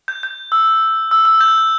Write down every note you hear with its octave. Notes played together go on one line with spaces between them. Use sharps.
G6
G6
E6
E6
E6
G6